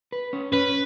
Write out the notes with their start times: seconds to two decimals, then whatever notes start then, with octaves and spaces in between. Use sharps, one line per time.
0.12 B4
0.33 C#4
0.53 C#4 B4